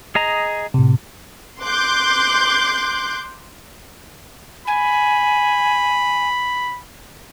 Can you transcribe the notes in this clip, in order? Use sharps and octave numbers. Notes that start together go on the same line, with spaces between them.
G#4 D#5 A#5
A2 C3
C6 D6 F#6 G6
G#5 B5